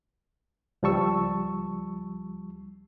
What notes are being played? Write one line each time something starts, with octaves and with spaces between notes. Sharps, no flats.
C#2 F3 G3 A5 C#6 E6